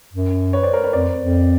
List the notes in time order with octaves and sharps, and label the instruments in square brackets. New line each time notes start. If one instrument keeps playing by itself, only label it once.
[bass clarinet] F#2
[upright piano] B4 C#5
C5 D5
A#4 C5
B4 C#5
[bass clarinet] F2 [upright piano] C5 D5
[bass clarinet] F2